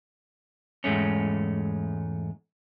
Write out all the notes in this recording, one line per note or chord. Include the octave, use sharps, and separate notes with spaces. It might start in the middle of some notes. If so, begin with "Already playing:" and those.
E2 G#2 G#3 A3 C#4